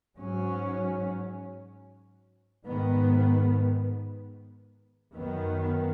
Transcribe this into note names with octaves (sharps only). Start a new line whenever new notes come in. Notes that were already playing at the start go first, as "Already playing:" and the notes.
G#2 F#3 C#4
G#2 D#3 B3
F#2 D#3 B3